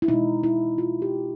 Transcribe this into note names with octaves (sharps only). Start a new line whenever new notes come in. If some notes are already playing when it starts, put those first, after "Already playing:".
E4
B2 G#3 D#4
E4
F4
G4